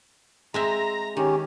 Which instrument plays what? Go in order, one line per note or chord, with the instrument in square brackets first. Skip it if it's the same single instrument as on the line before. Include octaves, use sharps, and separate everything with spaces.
[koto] G#3 C4 E5 [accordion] A#5
[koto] D#3 [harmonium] C#4 G4